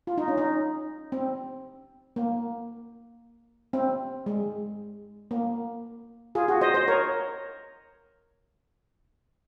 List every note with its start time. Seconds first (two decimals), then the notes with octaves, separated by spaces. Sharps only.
0.07 F4
0.18 D#4
0.28 C#4
0.38 D#4
1.12 C4
2.16 A#3
3.73 C4
4.26 G#3
5.31 A#3
6.35 F4 G#4
6.48 F#4
6.61 C5 D#5
6.74 C5 D#5
6.88 A#4 C#5